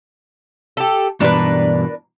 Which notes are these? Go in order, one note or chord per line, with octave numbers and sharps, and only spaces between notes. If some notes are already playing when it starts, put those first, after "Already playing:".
G4 A4
G2 B2 E3 D4 A#4 B4